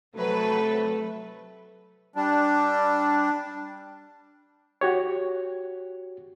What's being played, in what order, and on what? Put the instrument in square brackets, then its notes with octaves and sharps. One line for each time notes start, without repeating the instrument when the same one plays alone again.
[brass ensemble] C3 A3 [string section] F#3 B4
[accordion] G3 D4
[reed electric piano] F#4 G4 C#5